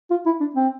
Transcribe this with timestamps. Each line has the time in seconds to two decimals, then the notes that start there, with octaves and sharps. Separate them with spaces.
0.10 F4
0.26 E4
0.40 D4
0.55 C4